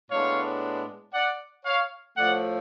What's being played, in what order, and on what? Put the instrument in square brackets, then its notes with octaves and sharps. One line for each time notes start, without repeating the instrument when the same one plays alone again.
[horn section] A2 G#3 B3 D4 C#5 F5
D5 F#5
C#5 F5
A2 F3 A3 D5 F#5